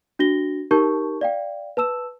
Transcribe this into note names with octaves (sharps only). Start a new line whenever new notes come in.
D4 F#4 A#6 G7
D#4 G4 A#4 A5 C#6 G6
D5 F5 G5
B4 A5 E6 E7